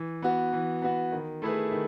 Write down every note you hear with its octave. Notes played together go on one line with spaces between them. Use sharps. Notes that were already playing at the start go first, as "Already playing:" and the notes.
Already playing: E3
B3 F#4
E3
B3 F#4
D#3
A3 E4 G#4 B4
D#3